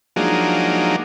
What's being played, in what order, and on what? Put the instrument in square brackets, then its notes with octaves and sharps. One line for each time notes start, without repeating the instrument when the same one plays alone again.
[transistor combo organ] F3 F#3 G#3 A#3 D4 D#4